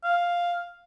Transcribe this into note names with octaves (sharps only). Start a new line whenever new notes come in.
F5